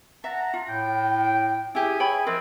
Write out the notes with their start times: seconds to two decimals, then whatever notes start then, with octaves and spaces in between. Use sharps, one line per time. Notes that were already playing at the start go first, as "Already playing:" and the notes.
0.24 E5 F#5 A5 A#5
0.54 F4
0.69 A2 G5
1.75 E4 G4 G#4 E5 G#5
2.00 C#5 G5 B5
2.27 F3 C4 A#4 D#5